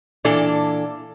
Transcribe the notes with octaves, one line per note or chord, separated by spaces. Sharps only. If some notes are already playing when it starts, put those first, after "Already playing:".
A#2 E3 D4 A4